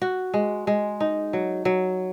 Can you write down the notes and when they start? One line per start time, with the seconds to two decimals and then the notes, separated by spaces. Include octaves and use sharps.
0.02 F#4
0.34 G#3
0.67 G#3
1.00 D#4
1.33 F#3
1.65 F#3